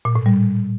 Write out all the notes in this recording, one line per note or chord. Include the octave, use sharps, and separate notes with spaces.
A#2
A2
G3